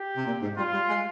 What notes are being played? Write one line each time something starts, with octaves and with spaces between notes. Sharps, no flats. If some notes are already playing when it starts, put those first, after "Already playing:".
Already playing: G4
C3
A#2
G#2
G3 F4
G3
G#3